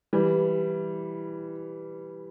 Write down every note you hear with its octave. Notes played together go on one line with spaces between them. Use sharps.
E3 G3